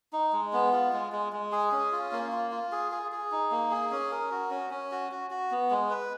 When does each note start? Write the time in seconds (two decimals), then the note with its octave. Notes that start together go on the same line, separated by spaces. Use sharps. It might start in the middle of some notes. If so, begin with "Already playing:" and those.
0.13 D#4
0.33 G#3
0.53 B3
0.73 F4
0.93 G#3
1.12 G#3
1.33 G#3
1.52 G#4
1.72 C#4
1.92 F4
2.12 A#3
2.32 F4
2.51 F4
2.72 G#4
2.92 G#4
3.12 G#4
3.32 D#4
3.51 A#3
3.71 G#4
3.91 C#4
4.12 A#4
4.31 F#4
4.51 C#4
4.70 C#4
4.91 F#4
5.11 F#4
5.31 F#4
5.51 B3
5.70 G#3
5.91 B4